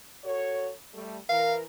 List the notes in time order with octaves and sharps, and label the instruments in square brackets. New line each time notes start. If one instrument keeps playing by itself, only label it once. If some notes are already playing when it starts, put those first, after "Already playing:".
[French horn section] F#4 A4 C#5
G3 A3
[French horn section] E3 A#4 [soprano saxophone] F5